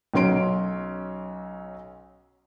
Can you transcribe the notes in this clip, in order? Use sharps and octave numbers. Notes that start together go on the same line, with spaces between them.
B1 F#3 C#4 C6 D7